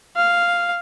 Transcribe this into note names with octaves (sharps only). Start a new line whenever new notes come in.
F5